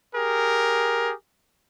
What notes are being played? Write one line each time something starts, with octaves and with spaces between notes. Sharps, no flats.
G4 G#4 A#4